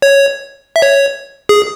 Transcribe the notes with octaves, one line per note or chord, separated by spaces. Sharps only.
C#5
E5
C#5
G#4